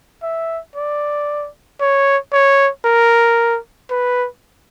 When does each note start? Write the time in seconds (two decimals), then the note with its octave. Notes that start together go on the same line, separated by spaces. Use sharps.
0.23 E5
0.75 D5
1.80 C#5
2.33 C#5
2.85 A#4
3.90 B4